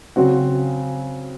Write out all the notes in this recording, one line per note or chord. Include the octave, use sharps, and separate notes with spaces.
C#3 F#3 C4 F#4